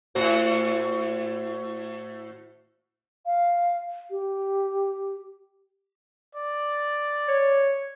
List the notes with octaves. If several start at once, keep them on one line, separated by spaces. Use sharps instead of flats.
A2 F#4 C5
F5
G4
D5
C#5